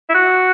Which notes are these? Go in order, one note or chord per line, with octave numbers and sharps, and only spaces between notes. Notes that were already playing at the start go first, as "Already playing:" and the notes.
E4
F#4